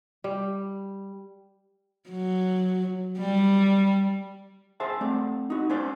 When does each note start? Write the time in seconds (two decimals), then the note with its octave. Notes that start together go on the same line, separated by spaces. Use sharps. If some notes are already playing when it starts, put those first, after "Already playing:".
0.24 G3
2.10 F#3
3.18 G3
4.80 G#4 C5 E5 A5
5.01 A3 C4 D5
5.50 D#4 F#4
5.70 C#4 B4 C5 D5